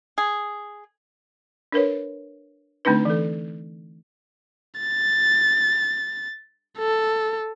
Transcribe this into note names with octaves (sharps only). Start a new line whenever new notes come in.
G#4
D4 A#4 B4 C#5
D3 A3 C4 D4 D#4 B4
E3 A4
A6
A4